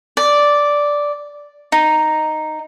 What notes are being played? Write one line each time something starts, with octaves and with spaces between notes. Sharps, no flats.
D5
D#4